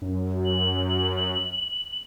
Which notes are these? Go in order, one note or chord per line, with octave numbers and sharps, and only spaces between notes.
F#2
F#7